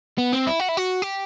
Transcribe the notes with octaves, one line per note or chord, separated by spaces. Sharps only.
B3
C4
E4
F#4
E4
F#4
G4